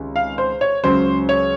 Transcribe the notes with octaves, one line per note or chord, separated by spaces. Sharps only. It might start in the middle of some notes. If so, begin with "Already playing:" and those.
Already playing: C#2 C3 D#3 D#4
F5
C5
C#5
C#2 C#3 F#3 C#4 C5
C#5